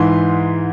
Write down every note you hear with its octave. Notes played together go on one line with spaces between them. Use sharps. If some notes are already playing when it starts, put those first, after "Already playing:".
Already playing: G#2 E3 C6